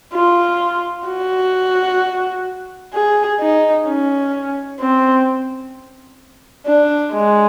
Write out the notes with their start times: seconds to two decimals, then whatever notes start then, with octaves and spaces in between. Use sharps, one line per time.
0.14 F4
1.07 F#4
2.94 G#4
3.41 D#4
3.87 C#4
4.80 C4
6.67 D4
7.13 G#3